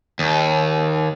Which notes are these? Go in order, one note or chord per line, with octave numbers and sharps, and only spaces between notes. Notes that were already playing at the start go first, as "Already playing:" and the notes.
D#2